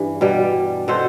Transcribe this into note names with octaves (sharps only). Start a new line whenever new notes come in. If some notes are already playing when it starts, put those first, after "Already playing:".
Already playing: G2 E3
B2 G3
B2 A4 C5